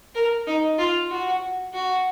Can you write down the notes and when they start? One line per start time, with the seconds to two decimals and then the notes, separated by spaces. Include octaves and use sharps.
0.15 A#4
0.47 D#4
0.79 F4
1.10 F#4
1.73 F#4